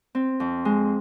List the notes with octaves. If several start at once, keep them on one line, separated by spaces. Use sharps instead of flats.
C4
F2
G#3